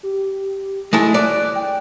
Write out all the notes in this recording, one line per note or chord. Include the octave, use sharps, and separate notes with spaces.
G4
G#3 A3 E4
D5 F#6
G5